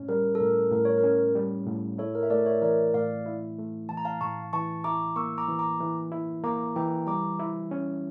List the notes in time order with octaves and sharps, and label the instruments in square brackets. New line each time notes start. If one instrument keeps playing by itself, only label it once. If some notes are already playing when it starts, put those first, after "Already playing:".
Already playing: [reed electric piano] A2 C#4
[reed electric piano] G3 [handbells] A#4
[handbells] A4
[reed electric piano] A2 [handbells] A#4
[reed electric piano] A2 [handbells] A#4
[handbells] C#5
A#4
[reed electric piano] C#4
G3
A2
[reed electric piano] E4 [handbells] A4 C#5
[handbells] A#4
E5
[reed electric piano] A3 [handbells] A#4 D5
[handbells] C#5 E5
[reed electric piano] E3 [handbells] A#4 D5
[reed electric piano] A2 [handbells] D5 F5
[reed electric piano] E4
A3
[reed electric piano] E3 [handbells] A5
[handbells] A#5
F5 A5
[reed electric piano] A2 [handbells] A5 C#6
[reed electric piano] E3 [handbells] A5 C#6
[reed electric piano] E4 [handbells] A#5 D6
[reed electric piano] A#3 [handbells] C#6 E6
[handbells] A#5 D6
[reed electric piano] E3
[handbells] A#5 D6
[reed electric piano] E3
E4
[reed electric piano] A#3 [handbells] A#5 D6
[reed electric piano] E3 [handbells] G5 A#5
[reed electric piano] G3 [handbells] A#5 D6
[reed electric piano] E4
C#4